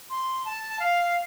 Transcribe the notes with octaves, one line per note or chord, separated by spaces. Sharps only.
C6
A5
F5